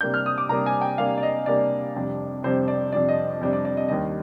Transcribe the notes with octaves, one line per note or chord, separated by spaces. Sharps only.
C3 G3 A#3 D4 G6
F6
D#6
D6
C3 G3 A#3 D4 A#5
G#5
G5
C3 G3 A#3 D4 F5
D5
D#5
C3 G3 A#3 D4 D5
F2 C3 G3 D4
F2 C3 G3 D4 C5
D5
F2 C3 G3 D4 D5
D#5
F2 C3 G3 D4
D5
D5
D#5
D#2 D#3 G3 D4 D#5